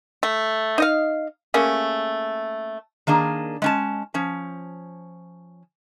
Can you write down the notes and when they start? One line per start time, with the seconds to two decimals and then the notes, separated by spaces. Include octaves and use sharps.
0.23 A3
0.78 D#4 D#5 F5
1.54 A3 A#3 C#4 G#4
3.07 D#3 A#3 D4 G#4
3.62 G#3 C#4 A5
4.14 F3 C#4